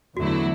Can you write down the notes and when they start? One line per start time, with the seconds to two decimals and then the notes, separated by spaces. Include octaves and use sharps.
0.16 E2 D3 F#3 A3 E4 F#4